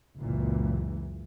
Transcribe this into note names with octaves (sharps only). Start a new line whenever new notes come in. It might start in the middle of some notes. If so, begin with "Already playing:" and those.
F#1 C#2 A#2 E3